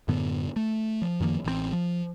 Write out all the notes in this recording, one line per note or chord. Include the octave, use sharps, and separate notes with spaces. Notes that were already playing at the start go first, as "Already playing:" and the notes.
F#2 A2 D3 B3
A3
F3
F#2 D#3 F3 A#3
A1 E3 G3 C4
F3